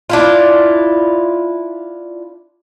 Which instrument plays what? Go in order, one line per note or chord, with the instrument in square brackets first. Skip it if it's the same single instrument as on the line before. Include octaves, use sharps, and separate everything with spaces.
[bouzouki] D4 E4 F4